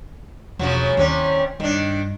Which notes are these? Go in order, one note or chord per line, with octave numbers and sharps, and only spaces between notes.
E1 C#3 F3 F#3
D#2 C3 G3 C#4 E4
G2 D#3 D4